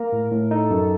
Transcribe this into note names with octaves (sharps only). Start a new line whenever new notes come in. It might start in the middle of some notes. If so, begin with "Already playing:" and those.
Already playing: A#3 A#4
A2
A2
D#4 A4
F#2